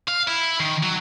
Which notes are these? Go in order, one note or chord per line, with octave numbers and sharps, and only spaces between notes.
F5
E4
D#3
F#3